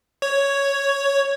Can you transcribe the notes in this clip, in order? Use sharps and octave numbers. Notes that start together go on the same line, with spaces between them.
C#5